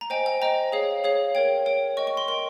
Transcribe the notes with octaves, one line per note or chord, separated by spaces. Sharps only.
A#5
C5 D#5 G5 G#5
G5
C5 D#5 G5 A#5
G#4 C#5 F5
G#4 C#5 F5
A#4 C#5 G5
A#4 C#5 G5
A#4 D#5 G5 C#6
C#6
C6
A#4 D#5 G5 C6